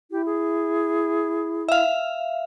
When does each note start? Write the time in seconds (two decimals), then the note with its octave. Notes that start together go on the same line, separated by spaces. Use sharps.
0.11 E4 G4
0.26 G#4
1.68 E5 F5